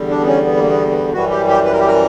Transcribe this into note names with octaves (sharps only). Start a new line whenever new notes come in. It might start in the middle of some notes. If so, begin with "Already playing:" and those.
Already playing: E2 D3 G3
D4
B3
C#4
B3
A#3
B3
B3
F#2 E3 G3 F#4
G4
G4
B4
A#4
G4
A#4